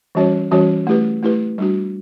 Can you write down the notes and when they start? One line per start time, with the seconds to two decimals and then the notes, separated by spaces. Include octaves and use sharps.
0.15 E3 G3 C#4 F#4 C#5
0.51 E3 G3 C#4 F#4 C#5
0.87 A3 E4 G4 B4
1.23 A3 E4 G4 B4
1.58 G3 D4 F#4